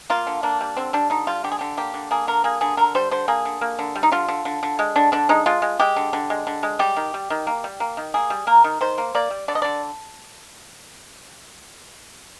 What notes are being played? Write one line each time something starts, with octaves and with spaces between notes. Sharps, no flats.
A#3 F4
D3
A#3 D4
G3
D3 C4
G3 D4
D3 D#4
G3 F4
D3 G4
G#4
D3 G4
A#3 G4
D3
A#3 G#4
D3 A#4
A#3 G#4
D3 G#4
D3 A#4
G3 C5
D3 C5
A#3 G#4
D3
A#3
D3
G3
D#4
D3 F4
D3
D3
D3
G#3
D3 D4
D3 D4
G#3 D#4
G#3 F4
G#3
G#3 G4
D3
D3
G#3
D3
G#3
G3 G4
D#3
G3
D#3
A#3
G3
A#3
D#3
A#3 G#4
G3
A#3 A#4
D#3
D#3 C5
A#3
A#3 D5
G3
D3 D5
D#5
D3 D5